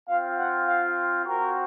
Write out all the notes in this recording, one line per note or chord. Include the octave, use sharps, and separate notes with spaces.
C4 F4 F5
F#5
F5
C4 F#4 A#4